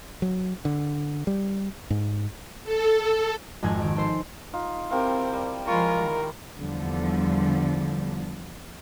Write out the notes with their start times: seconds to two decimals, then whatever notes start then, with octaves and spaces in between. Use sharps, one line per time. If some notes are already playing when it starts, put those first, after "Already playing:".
0.22 F#3
0.65 D3
1.27 G3
1.90 G#2
2.64 A4
3.62 G#1 F2 G#3 G#6
3.82 D#3 D7
3.96 A4 C5 C6
4.53 D#4 F4
4.90 C4 E4 F4 G4 A#4
5.33 G3
5.67 F3 G#3 F4 A#4 B5 C#6
6.00 D#3
6.55 E2 D3 F3 G3